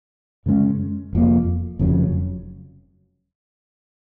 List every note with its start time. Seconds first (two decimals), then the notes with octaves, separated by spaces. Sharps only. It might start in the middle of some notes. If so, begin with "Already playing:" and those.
0.46 F#2 C#3 G#3 C#4
1.13 F1 F2 F3 A#3
1.79 F1 F2 C#3 F#3